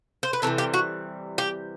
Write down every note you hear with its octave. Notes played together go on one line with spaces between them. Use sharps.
C5
B4
C3 E3 G3 A4
G4
F#4
G4